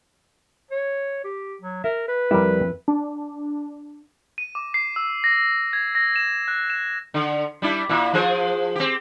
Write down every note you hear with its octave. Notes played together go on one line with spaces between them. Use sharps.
C#5
G4
F#3
A#4 E5
B4
F2 G3 E4 A#4
D4
D#7
D6
C7
E6
A#6
G#6
A#6
E7
F#6
E7
D3
G3 D4 E4
A#2 E4
F3 G#4 C5
C4 G4